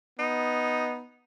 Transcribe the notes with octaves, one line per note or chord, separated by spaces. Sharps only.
B3 D#4